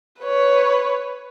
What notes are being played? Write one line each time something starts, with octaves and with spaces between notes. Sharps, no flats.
B4 C#5